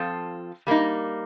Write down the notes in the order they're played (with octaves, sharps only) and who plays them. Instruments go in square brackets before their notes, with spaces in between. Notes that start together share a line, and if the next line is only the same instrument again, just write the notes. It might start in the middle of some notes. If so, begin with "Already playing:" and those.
Already playing: [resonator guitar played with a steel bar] F3 C4 F4 A4
G3 A#3 D#4